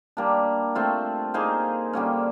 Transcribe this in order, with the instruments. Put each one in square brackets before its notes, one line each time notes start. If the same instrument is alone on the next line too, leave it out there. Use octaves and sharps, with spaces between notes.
[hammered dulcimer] G3 A#3 D4
A3 C4 F4
A#3 D#4 G#4 C5
D3 G3 A#3 C#4